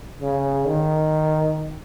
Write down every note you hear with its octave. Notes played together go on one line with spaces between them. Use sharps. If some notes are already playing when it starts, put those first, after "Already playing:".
C#3
D#3